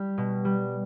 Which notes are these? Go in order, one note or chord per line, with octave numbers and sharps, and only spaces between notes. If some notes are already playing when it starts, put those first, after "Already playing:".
Already playing: G3 G4
B2
G3